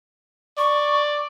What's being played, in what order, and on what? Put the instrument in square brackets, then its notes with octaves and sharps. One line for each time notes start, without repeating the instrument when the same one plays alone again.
[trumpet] D5 [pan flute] C#6